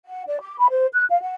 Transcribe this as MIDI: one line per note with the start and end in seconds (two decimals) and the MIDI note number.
0.05 0.22 78
0.26 0.40 74
0.41 0.57 86
0.59 0.67 83
0.71 0.88 72
0.93 1.05 90
1.10 1.18 77
1.22 1.35 78